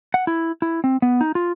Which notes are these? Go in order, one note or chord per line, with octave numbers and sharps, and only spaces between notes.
F#5
E4
E4
C4
B3
D#4
F4